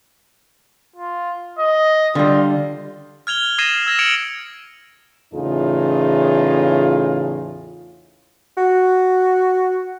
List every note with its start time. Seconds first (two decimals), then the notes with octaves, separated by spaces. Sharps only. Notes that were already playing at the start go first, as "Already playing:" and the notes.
0.96 F4
1.59 D#5
2.15 D3 G3 F4
3.27 F6 G#6 F7 G7
3.58 D#6 G#6 A#6 C7 D#7 E7
3.86 E6 G#6 A#6 E7
3.99 D#6 G#6 C#7 D7 F7 F#7
5.34 E2 A2 C#3 D#4 F4 G#4
8.58 F#4